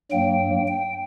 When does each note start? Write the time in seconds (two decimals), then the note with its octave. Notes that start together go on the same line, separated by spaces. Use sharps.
0.12 G2 F#3 A#3 G5
0.68 G5